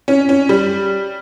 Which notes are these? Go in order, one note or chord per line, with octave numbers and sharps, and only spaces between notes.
C#4
C#4
G3